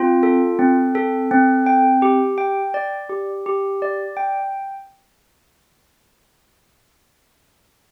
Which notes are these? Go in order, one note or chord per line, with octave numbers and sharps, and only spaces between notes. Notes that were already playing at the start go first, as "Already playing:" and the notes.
Already playing: C4 F4
A4
C4
A4
C4
G5
G4
G5
D5
G4
G4
D5
G5